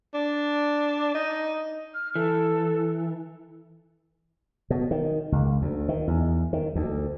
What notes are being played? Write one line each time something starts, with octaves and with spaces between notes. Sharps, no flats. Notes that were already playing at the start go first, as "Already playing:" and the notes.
D4
D#4
F6
E3 A4
B2
D#3
C#2
D2
D#3
E2
D#3
D2